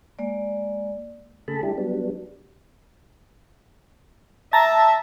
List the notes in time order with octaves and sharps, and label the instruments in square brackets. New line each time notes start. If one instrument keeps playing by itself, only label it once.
[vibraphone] G#3 A#3 D5
[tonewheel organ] C#3 A3 G#4 A4 A5 B5
G3 D4 E4 G4
F#3 G3 B3 D4
[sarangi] E5 [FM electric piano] A5 A#5